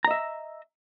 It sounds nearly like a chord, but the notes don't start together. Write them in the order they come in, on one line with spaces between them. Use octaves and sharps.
A#5 D#5 E5